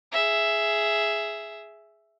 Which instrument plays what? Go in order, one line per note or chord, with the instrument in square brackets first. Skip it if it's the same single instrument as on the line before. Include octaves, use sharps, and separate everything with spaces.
[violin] G#4 E5